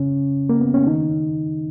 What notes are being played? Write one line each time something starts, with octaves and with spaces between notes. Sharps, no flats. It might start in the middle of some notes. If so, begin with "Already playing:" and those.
Already playing: C#3 C#4
A#3
B3
C#4
D#3 D#4